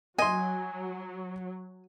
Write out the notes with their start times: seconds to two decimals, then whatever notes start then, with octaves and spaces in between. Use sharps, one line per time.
0.18 F#3 D#5 G#5 C6